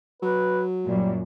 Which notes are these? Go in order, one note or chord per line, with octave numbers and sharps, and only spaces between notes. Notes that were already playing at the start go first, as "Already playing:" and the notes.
F#3 B4
F#2 A#2 G3